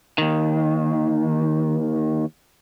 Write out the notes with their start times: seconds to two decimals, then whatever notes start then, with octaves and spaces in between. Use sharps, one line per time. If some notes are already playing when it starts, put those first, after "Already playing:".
0.18 D#2 D#3